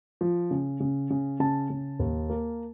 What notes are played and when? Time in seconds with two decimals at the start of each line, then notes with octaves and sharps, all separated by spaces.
0.21 F3
0.51 C#3
0.80 C#3
1.10 C#3
1.40 C#3 A5
1.70 C#3
1.99 D#2
2.30 A#3